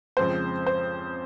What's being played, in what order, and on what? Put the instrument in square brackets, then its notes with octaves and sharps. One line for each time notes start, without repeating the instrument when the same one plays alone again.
[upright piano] F2 C#3 F3 G#3 C4 C5
C5